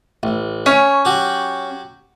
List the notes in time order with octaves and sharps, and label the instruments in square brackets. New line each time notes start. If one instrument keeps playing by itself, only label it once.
[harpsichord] A1
[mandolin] C#4 [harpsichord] C#5
[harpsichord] F#3 F#4 G4